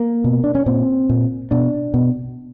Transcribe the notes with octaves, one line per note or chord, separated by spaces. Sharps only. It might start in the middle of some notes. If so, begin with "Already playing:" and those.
Already playing: A#3
B2
D4
C#4
A#2 C4
A#2
B2 D4
B2